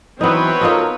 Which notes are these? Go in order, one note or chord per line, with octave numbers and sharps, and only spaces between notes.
E3 F#3 B3 C4 D#4 B4 C#5
D#4 F4 F#4 A4 A#4 D#5